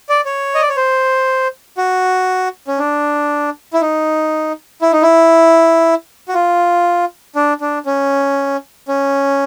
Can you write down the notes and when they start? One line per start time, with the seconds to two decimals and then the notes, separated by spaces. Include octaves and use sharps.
0.09 D5
0.25 C#5
0.55 D#5
0.62 D5
0.69 C#5
0.77 C5
1.77 F#4
2.68 C#4
2.79 D4
3.73 E4
3.81 D#4
4.82 E4
4.92 D#4
5.02 E4
6.28 F#4
6.34 F4
7.36 D4
7.61 D4
7.86 C#4
8.88 C#4